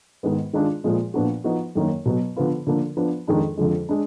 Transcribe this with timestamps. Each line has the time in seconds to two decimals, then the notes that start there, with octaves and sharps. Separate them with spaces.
0.23 G#2 D#3 G#3 B3
0.53 D#3 G#3 D4 F4
0.84 A#2 F3 G#3
1.14 A#2 F3 B3 D4 F#4
1.44 F3 B3 D#4 F#4
1.75 F#2 D#3 A#3
2.05 B2 F#3 B3
2.36 D3 F3 B3 F4
2.67 D3 F3 A#3 D4
2.97 F3 B3 D4
3.28 F2 D#3 G#3 D4
3.57 F2 D3 F3 G#3
3.89 G#3 D4